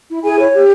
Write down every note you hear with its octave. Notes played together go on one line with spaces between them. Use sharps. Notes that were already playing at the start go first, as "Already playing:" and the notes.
E4
E4 G#4 G#5
C#5
G4